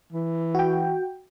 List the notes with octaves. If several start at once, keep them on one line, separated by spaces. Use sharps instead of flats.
E3
F#4 G5